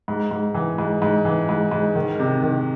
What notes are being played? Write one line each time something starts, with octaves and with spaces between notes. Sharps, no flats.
G#2
G#2
E3
G#2
G#2
E3
G#2
G#2
D#3
C3
D#3